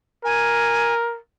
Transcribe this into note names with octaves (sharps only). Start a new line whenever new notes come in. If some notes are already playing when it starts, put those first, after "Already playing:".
A#4 G#5